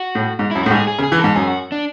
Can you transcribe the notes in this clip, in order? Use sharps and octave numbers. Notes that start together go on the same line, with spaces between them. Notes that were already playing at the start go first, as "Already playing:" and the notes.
Already playing: F#4
A2
G#2
F#2 E4
A2 F#4
G#2
G#4
G#4
C#3
G#4
E3
G#2 A4
F#2 G#4
F#4
D4